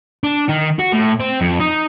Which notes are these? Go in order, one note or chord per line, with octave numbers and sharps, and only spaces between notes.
D4
D#3
F#4
A2
C4
F2
D#4